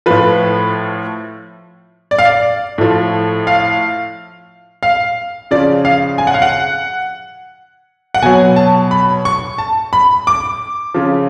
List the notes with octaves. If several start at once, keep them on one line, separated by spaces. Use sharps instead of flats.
A2 F3 B4
D5
F5
D5
A2 F3
F5
F5
C#3 F3 D5
F5
G#5
F#5
F5
F#5
F#5
B2 F#3 G#5
A5
B5
C#6
A5
B5
D6
C#3 F3